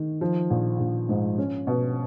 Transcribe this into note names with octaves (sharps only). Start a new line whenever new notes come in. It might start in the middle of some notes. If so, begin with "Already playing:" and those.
Already playing: D#3
F3
A#1
A#1
G#2
C#4
B2